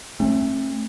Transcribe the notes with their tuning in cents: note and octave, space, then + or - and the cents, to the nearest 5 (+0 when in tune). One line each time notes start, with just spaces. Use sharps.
A3 +0 C4 +45